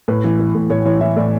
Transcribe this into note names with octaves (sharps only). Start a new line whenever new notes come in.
A2 B4
E3
E3
A2
A2 C#5
E3 C#5
E3 E5
A2 D5